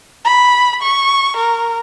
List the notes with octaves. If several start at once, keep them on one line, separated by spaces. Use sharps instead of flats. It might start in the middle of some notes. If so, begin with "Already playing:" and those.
B5
C#6
A#4